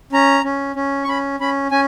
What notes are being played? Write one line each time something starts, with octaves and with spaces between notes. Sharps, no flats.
C#4 A#5
C#4
C#4
C#6
C#4 B5
C#4 B5
C#4 G#5